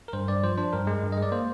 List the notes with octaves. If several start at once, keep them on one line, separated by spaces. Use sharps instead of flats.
A#4
G2 C5
G2 D5
F3 C5
D4 C5
G2 A#4
G#3
G2
D#5
G#3
D5
A#3 C5